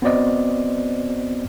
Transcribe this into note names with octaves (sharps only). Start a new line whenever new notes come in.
B3 C4 F#4 C5 D5 D#5